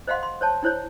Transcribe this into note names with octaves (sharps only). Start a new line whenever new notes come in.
C5 D#5 F5 F#5 C6
C6
C5 C#5 A5
D4 E4 C5 C#5